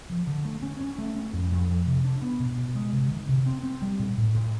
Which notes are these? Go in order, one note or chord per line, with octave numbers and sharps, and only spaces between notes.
F3
D3
A3
C#4
C#4
A3
C#4
F2
F2
F3
C3
D4
B3
B2
B2
G#3
C3
D#3
C3
C4
C4
G3
A#2
A2
A2